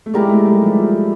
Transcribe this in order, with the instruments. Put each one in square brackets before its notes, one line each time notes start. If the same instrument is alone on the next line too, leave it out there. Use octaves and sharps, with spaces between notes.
[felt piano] A3
[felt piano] G#3 [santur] E4 G4 A#4 D5
[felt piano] A3
G3
F3